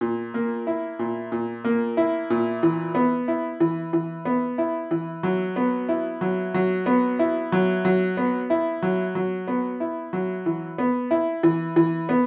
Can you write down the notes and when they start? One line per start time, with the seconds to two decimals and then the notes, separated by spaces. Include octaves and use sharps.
0.01 A#2
0.34 A#3
0.67 E4
0.99 A#2
1.32 A#2
1.65 A#3
1.97 E4
2.30 A#2
2.63 E3
2.95 B3
3.28 E4
3.60 E3
3.93 E3
4.25 B3
4.58 E4
4.91 E3
5.23 F#3
5.56 B3
5.89 E4
6.21 F#3
6.54 F#3
6.86 B3
7.19 E4
7.52 F#3
7.85 F#3
8.17 B3
8.50 E4
8.82 F#3
9.15 F#3
9.48 B3
9.80 E4
10.13 F#3
10.46 E3
10.78 B3
11.11 E4
11.43 E3
11.76 E3
12.09 B3